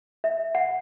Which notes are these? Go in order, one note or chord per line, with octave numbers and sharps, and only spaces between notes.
E5
F#5